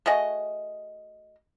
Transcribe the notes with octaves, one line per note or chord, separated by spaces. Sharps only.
A3 F#4 G#4 D#5